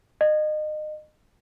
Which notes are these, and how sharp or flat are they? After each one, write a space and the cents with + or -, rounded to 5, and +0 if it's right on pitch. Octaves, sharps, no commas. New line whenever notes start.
D#5 -30